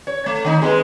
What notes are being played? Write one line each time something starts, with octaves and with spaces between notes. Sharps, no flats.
C#5
A3
D#3 D#4
G#3 B3